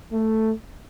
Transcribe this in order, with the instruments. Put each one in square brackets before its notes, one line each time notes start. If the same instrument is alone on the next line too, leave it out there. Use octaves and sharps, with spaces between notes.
[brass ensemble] A3